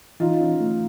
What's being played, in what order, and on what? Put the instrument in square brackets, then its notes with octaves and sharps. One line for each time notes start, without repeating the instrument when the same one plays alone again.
[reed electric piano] E3 [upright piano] D#4 F4
[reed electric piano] C#4
A3